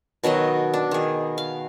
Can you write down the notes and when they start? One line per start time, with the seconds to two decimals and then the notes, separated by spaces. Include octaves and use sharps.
0.24 B2 D#3 F#3 D#5
0.74 D4
0.91 D#3 G#4
1.38 F5